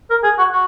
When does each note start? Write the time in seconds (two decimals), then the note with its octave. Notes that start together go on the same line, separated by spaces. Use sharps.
0.10 A#4
0.24 G#4
0.38 F#4
0.52 F#4